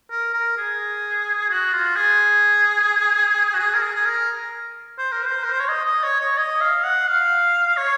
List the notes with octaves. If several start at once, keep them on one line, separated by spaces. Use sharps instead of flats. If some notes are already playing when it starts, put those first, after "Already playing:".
A#4
A#4
G#4
F#4
F4
G#4
F#4
G#4
A#4
G#4
G#4
A#4
C5
A#4
C5
A#4
C5
C#5
D#5
D#5
C#5
C#5
D#5
F5
F#5
F5
C#5